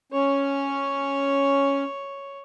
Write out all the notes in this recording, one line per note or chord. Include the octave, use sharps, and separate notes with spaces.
C#4 C#5